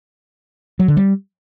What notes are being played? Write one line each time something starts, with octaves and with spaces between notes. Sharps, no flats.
F#3
D3
G3